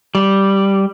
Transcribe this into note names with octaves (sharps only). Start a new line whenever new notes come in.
G3